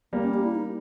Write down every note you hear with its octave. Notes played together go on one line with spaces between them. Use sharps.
G3 A#3 B3
C#4
G4
E4
D#4